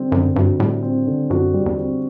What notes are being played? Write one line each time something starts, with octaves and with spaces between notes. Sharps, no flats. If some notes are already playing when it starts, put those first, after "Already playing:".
Already playing: D3 G3 C4
F#2 D3
G2 F#4
A2 G3
C4
D3
F#2 F#4
G3
E2
C4